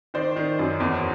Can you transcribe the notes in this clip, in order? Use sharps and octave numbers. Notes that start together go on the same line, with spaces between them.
D#3 C5 D5
D#3
F#2
E2